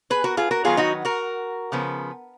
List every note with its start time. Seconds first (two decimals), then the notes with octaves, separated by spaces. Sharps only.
0.10 G#4 B4
0.24 F#4 A#4
0.37 F4 G#4
0.51 F#4 A#4
0.64 D#3 F#3 B3 F4 G#4
0.77 D#4 F#4
1.05 F#4 A#4
1.72 C#3 F3 B3